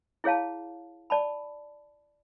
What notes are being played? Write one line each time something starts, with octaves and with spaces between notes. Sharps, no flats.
E4 G#4 C#5 F5 A5
D5 A5 B5